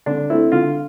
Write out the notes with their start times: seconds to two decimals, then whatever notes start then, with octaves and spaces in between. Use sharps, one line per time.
0.06 D3 D4
0.30 A3 C4 E4
0.52 D3 F4